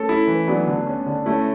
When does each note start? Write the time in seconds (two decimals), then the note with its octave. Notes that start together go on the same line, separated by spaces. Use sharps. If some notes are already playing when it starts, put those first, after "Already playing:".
Already playing: A3 C#4 A4
0.09 E4
0.27 E3
0.48 F#3 B3 D4
0.67 D3
0.87 C#4
1.06 D3
1.26 A3 C#4 E4